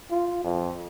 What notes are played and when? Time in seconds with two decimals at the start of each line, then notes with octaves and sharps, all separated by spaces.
0.11 F4
0.44 F2